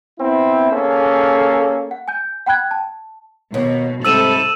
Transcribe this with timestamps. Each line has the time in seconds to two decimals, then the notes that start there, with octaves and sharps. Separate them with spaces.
0.20 B3 C4 E4
0.71 A#3 C#4 G#4 A4
1.91 F#5
2.08 G#5 G6
2.46 F#5 G5 B5 F#6 G#6
2.71 A5
3.54 D#2 B2
4.05 G#2 C3 G3 A4 E6 D#7 E7